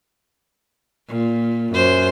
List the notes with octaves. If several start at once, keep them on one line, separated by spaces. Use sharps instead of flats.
A#2
F#2 C5